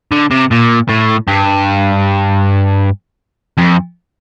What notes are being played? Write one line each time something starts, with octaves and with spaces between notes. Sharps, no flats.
D3
C3
A#2
A2
G2
F2